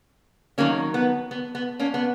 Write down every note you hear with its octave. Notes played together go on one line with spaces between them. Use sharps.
D#3 F#3 A#3 C#4
B3
B3
B3
A#3 C#4
B3